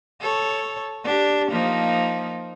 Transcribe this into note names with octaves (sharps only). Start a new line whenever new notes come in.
A4 C#5
D4 G4
F3 A#3 D#4